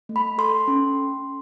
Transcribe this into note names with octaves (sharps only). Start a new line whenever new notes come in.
A3
B5
A4 C6
C#4